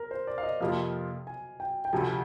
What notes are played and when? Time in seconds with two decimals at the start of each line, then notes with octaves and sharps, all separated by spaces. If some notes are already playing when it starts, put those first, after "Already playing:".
Already playing: A#4
0.11 C5
0.27 D5
0.38 F5
0.43 D#5
0.61 F2 C3 F3 A#3 F4 F5
1.27 G#5
1.60 G5
1.85 G5
1.93 D2 C3 F3 G#5